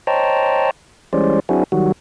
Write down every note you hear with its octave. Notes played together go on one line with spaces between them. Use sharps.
C5 C#5 D#5 G5 A5 A#5
E3 G3 G#3 C#4 C5 D5
F#3 C4 D4 E4 F#4 G#4
D#3 F#3 G3 F#4